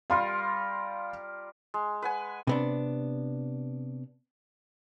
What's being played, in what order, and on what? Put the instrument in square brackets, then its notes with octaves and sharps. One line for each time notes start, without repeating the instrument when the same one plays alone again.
[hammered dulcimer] G3 F4 A#4 [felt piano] F5 C6
[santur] G#3
B4 F#5 G#5
[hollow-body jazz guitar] C3 B3 D4